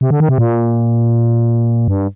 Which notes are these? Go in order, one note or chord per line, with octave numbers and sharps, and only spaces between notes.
C3
D3
D#3
C3
A#2
G2